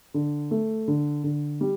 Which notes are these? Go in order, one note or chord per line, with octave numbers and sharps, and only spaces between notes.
D3
A3
D3
D3
G3